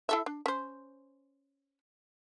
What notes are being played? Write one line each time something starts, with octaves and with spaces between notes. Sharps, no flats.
E4 A4 E5
D4
C#4 C5